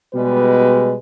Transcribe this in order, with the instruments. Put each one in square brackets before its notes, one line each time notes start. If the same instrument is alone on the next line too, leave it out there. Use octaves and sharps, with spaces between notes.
[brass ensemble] B2 G3 G#3 B4